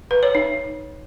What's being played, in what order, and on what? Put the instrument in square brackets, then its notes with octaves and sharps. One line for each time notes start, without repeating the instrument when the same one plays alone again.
[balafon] B4
C#5
D#4